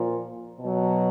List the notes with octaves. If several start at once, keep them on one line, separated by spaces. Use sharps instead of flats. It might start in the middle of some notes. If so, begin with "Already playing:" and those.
Already playing: A#2 F3
B2 F#3